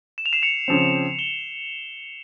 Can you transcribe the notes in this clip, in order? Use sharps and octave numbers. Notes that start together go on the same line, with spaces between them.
E7
F7
C7 E7
C#7 F7
C#3 F3 C4
E7 G7